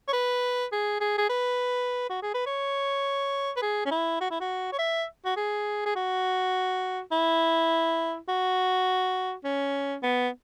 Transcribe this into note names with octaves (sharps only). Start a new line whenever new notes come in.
C#5
B4
G#4
G#4
G#4
B4
F#4
G#4
B4
C#5
B4
G#4
C#4
E4
F#4
E4
F#4
C#5
E5
F#4
G#4
G#4
F#4
E4
F#4
C#4
B3